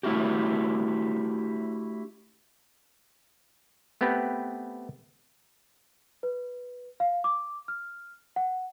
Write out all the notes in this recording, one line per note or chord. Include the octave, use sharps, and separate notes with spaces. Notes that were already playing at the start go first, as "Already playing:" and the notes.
A3 D4 E4 F#4 G4
A3 B3 C4 G4 B4
B4
F5
D6
F6
F#5